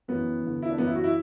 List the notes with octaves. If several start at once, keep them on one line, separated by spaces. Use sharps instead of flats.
F#2 E3 B3
E2 D3
E4
D4
F#2 E3 B3
E4
F#4
E4